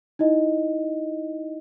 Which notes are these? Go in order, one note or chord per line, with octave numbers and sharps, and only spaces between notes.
D#4 E4 D#5